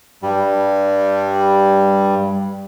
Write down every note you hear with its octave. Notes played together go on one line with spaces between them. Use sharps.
G2 G3